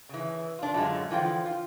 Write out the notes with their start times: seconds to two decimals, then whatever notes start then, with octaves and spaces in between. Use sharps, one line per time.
0.09 C#3 E3
0.59 D4 F4
0.74 F#2 A2 D3 F#3 G#3 F4
1.10 D3 E3 F3 F4 G5
1.45 F4